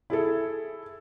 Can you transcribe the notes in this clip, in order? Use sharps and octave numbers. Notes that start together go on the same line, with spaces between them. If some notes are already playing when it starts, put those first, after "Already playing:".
E4 G#4 A4